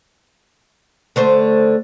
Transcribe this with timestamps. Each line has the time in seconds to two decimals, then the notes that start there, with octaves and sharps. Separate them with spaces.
1.16 D3 A3 C5